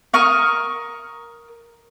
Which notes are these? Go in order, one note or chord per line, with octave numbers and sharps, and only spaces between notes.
A#4 C#6 D#6 F6